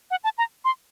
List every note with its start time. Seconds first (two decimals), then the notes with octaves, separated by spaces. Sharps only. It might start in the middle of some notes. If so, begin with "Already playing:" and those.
0.11 F#5
0.24 A5
0.38 A#5
0.65 C6